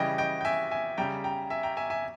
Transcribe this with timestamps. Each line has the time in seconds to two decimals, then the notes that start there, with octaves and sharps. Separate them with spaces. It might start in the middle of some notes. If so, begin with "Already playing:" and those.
Already playing: C#3 E3 G3 D#5 G5
0.18 D#5 G5
0.41 G5
0.45 E5 G#5
0.71 E5 G#5
0.98 C#3 G3 G5 A#5
1.24 G5 A#5
1.50 E5 G#5
1.63 G5 A#5
1.77 E5 G#5
1.90 E5 G#5